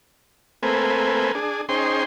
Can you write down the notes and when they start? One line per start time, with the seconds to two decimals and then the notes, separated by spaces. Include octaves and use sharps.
0.63 A3 A#3 C4 B4 G#5
1.35 D4 G#4
1.69 C#4 D#4 G#4 C5 G5 C6